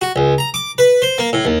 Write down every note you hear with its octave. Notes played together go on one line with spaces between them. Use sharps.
F#4
C#2
A#5
D6
B4
C5
A#3
A2
D#2